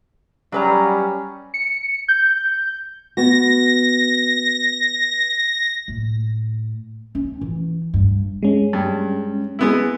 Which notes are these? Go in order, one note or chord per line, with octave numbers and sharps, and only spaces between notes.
F#3 G3 C#4 B4 A#5
C#7
G6
B3 F#4 A#6
A2
C#4
E3
G2
G#3 C#4
G2
G#3 B3 E4